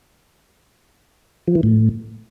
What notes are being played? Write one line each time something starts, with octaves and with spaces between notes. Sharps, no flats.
F3
E3
A2